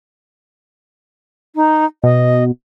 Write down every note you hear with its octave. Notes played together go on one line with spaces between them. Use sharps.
D#4
B2 D#5